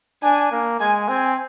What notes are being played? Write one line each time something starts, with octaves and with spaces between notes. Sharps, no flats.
D4 G#5
A#3
G#3 G#5
C4 G#5